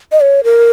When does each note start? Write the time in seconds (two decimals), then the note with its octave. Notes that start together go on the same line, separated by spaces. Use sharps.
0.12 D#5
0.21 C#5
0.44 A#4